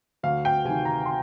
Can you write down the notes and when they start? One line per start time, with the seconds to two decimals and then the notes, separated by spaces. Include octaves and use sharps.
0.23 D2 F5
0.45 G5
0.65 C3 D#3 G#5
0.85 A#5
1.06 C6